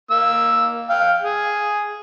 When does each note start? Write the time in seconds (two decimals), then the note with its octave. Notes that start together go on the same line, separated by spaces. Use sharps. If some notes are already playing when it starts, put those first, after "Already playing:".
0.11 A#3 E6
0.89 F5 G5
1.22 G#4